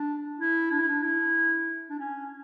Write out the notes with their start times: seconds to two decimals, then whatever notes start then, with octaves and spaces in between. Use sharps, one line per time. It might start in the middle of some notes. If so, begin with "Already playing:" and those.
Already playing: D4
0.39 E4
0.71 D4
0.80 E4
0.88 D4
1.03 E4
1.90 D4
1.99 C#4